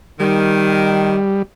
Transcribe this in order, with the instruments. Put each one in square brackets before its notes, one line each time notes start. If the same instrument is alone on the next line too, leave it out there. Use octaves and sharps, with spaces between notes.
[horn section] D#3 [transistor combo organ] G3